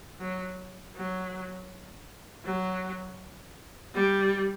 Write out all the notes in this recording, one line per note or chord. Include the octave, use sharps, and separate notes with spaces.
F#3
F#3
F#3
G3